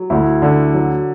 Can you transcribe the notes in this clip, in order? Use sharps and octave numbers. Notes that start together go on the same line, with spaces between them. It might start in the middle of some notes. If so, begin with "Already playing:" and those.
Already playing: F#3
D2 E4
D3
F#3